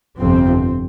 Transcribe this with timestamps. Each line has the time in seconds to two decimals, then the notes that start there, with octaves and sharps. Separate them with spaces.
0.19 G1 F2 C3 C4